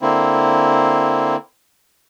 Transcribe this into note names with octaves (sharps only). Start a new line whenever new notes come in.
D3 A#3 C4 E4